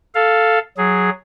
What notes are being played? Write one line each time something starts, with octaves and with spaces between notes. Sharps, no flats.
A4 F5
F#3 G#4